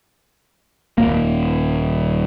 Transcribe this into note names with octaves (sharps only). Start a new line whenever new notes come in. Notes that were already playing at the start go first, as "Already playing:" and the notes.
D#1 F2 A#3